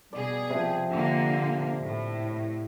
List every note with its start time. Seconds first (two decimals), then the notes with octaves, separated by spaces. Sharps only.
0.13 B2 G3 G#4 D5
0.50 C3 F3
0.92 A#2 D3 A#3
1.82 A2